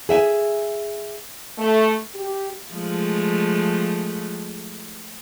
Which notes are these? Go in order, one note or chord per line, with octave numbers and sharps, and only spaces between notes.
G#4 E5 G5 G#5
A3
G4
F3 G#3 A3